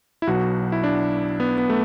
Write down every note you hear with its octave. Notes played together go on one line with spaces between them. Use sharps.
E4
B1 B2 F#3 F#4
E4
D4
B3
B3
A3